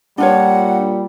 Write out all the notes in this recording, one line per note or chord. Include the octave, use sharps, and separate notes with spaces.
A#2 G3 D4 F4 C#5 F#5